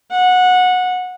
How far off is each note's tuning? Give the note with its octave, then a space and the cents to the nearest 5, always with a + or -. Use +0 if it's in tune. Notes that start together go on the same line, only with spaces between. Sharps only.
F#5 -20